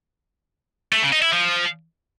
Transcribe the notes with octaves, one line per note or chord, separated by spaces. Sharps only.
A3
C#3
D#4
E4
F3